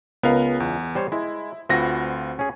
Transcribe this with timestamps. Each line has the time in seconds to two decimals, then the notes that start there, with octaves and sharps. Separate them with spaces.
0.23 C#2 B3 A#4 F5
0.60 E2
0.95 G3 C5 C#5
1.12 G#3 E4
1.69 D2 C4 F4 F#4 B4 A#6
2.39 C#4 G#4